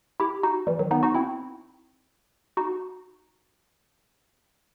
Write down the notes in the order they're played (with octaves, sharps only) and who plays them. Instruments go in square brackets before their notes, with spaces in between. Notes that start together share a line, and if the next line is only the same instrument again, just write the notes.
[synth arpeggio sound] E4 G4
D#4 F#4
E3 G3
D#3 F#3
B3 D#4
D#4 F#4
C4 E4
D#4 F#4